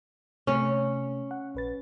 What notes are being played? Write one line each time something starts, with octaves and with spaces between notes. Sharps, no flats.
C3 A3 C#4
F#5
A#1 B4 A6